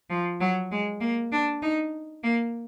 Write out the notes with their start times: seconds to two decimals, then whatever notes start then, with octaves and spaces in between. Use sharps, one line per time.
0.10 F3
0.40 F#3
0.71 G#3
1.00 A#3
1.32 D4
1.62 D#4
2.23 A#3